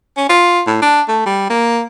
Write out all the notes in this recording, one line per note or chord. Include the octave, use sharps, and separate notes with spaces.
C#4
F4
A2
D4
A3
G3
A#3